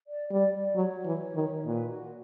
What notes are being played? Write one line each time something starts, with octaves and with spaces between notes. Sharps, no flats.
D5
G3 D5
D5
F#3 C#5
E3
D#3
A#2 B4
F#4